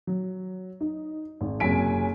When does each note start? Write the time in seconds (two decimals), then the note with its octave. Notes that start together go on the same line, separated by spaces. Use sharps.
0.07 F#3
0.81 D#4
1.41 G#1
1.60 F#1 C3 F#3 G#5 B6 D7